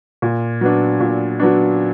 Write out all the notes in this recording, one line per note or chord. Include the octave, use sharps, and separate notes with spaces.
A#2
F#3 B3 D4
A#2
F#3 B3 D4